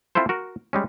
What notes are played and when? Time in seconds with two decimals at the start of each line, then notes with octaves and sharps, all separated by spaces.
0.15 C4 E4 F4 A4 C5
0.29 F#4 A#4
0.73 G3 G#3 C#4